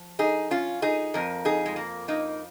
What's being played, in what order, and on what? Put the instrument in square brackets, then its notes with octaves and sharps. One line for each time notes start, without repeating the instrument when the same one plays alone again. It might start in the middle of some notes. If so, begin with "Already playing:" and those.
Already playing: [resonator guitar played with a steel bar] F3
D#4 G#4
C#4 F4
D#4 G#4
F2 F3 A#4
D#4 G#4
G#3
A#3
A#3 D#4